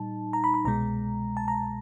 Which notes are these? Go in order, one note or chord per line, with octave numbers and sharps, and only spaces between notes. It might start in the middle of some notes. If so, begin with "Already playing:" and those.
Already playing: A#2 G3 D#4 A5
A#5
B5
B5
C2 B2 G#3 A#5
A5
A#5